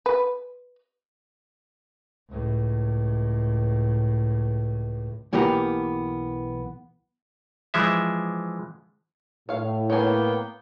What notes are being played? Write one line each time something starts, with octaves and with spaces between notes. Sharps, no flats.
B4
C#2 A2
B1 E3 A#3 B3 G4 A#5
E3 F3 G#3 E5
A2 C#5 F5
A#3 B3 C#5 G5 G#5